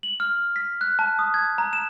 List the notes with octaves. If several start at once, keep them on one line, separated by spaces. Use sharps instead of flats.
F#7
F6
B6
F#6
A5
D#6
G#6
A#5
E7